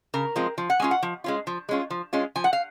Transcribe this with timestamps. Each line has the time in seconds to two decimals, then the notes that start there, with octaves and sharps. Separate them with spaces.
0.14 C#3 A#4
0.36 F3 G#3 C4 F4
0.58 F3
0.70 F#5
0.79 G#3 C#4 F4 G#5
0.91 F#5
1.03 F3
1.24 G#3 C#4 F4
1.47 F3
1.69 G#3 C#4 F4
1.90 F3
2.13 G#3 C#4 F4
2.36 F3 G#5
2.44 F#5
2.53 F5